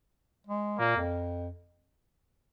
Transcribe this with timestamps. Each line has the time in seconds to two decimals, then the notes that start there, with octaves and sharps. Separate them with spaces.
0.47 G#3
0.79 A#2 A#3
0.96 F2